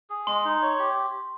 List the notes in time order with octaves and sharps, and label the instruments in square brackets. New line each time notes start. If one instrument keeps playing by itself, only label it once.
[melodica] G#4
[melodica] G#3 [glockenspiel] C6
[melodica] D#4
C#5
G4